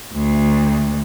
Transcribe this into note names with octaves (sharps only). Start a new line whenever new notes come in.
D2